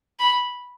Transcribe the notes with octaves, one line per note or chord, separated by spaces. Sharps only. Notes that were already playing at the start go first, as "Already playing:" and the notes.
B5